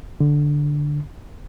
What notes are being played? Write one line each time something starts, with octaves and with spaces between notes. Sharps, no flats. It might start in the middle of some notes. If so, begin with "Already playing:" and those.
D3